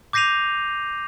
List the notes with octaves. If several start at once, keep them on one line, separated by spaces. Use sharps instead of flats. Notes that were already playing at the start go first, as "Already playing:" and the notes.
D6 G6 A#6 C7 D#7 F7